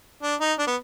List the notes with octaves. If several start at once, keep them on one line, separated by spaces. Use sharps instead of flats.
D4
D#4
D4
B3